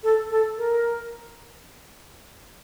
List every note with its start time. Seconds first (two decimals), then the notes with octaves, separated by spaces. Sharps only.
0.03 A4
0.30 A4
0.58 A#4